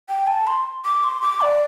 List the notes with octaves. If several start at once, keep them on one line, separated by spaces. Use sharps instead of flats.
G5
A5
C6
D6
C6
D6
D5